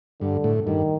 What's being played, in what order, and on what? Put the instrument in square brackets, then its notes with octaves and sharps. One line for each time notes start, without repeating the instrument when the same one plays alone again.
[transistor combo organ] G2 [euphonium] D3
[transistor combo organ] A2
[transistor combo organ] G2 [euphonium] D#3